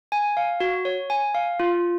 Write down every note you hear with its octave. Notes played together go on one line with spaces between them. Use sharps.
G#5
F5
F#4
C#5
G#5
F5
F4